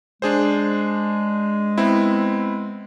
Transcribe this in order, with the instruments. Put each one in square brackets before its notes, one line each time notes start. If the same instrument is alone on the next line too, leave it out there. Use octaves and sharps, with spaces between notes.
[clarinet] G#3 [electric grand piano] D4 G#4 C5
[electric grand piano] B3 C4 E4